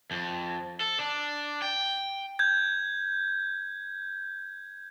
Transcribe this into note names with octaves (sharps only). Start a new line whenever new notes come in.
F2
A4
D4
G5
G6 G#6